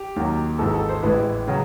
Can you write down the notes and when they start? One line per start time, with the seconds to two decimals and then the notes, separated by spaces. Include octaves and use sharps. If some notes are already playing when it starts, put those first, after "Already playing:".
Already playing: G4
0.16 D#2 D#3 F#3
0.59 G#1 G#2 E3 G#3 A4
0.74 A4
0.89 C5
1.03 A1 A2 E3 G#3 B4
1.48 C#3 F#3